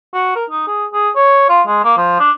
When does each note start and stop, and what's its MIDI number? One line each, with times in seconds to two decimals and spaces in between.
0.14 0.34 66
0.36 0.45 70
0.50 0.65 63
0.67 0.86 68
0.93 1.09 68
1.16 1.46 73
1.49 1.62 65
1.67 1.83 56
1.84 1.93 58
1.97 2.18 53
2.20 2.31 62